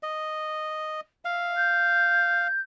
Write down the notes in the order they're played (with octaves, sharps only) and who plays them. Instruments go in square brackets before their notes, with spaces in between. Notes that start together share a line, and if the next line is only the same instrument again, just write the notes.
[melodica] D#5
[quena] E5 [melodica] F5
[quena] G6